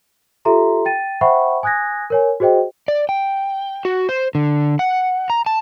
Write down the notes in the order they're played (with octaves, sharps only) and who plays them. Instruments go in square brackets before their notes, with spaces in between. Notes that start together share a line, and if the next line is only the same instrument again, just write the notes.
[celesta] F4 G4 A4 E5 A#5 C6
G5 A6 D#7
C5 E5 F#5 G5 B5 C#6
G#5 D#6 F#6 G#6 A#6
A#4 C#5 G#5
F#4 G#4 C5 D#5 G5
[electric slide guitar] D5
G5
F#4
C5
D3
F#5
A#5
A5